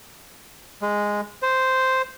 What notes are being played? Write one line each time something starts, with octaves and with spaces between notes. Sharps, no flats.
G#3
C5